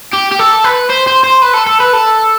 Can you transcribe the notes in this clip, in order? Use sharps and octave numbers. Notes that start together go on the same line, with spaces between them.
G4
G4
A4
B4
C5
C5
C5
B4
A4
A4
B4
A4